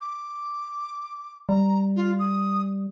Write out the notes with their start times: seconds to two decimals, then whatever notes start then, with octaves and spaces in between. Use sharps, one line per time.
0.01 D6
1.49 G3 A#5
1.96 F4
2.19 D#6